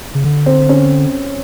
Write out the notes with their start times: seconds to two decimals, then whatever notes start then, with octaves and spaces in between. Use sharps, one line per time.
0.15 C#3
0.24 D3
0.46 C4
0.69 C#4